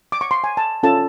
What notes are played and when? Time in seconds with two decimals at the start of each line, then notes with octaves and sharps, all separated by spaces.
0.12 D6
0.21 C#6
0.31 C6
0.44 G#5
0.57 A5
0.83 C#4 F4 A4 A5